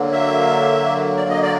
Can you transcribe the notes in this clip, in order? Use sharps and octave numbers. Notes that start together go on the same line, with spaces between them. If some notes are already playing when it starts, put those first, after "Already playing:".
Already playing: D3 F#3 A#3
E5
D5
D#5
D5